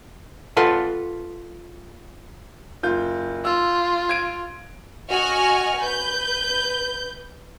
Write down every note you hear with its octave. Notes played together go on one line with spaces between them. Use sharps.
F4 A4 B4 F#5
F#1 F4 G6
F4 E6
G#6 D7 D#7
F#4 D#5 G#5 C#6 F6
B4 G6